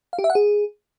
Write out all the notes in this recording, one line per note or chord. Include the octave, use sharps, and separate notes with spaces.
F5
G4
E5
F#5
G#4